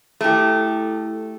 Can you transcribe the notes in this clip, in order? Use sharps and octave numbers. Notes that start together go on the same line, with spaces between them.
A3 E4 G4 A4